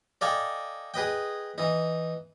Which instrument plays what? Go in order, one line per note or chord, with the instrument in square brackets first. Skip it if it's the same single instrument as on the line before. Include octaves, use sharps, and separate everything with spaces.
[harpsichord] A4 D5 D#5 F5 G5 G#5
G#4 B4 D#5 G5
E3 D#4